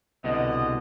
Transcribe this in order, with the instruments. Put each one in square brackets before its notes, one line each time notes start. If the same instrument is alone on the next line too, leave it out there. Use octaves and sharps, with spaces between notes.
[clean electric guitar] C2 B2 D3 [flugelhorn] D#5